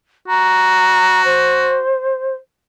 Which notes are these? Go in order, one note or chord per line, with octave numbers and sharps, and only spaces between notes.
F#4 A#5
C5